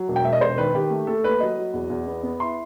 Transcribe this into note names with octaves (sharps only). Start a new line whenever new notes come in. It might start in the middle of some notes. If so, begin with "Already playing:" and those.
Already playing: F#3
E1
G5
E1 E5
D#5
E1 C5
D#3 B4
D#3 G4
A3
A3 A4
D#2 B4
F#3 D#5
F#3
E2
E2
B3
B3
E4 C6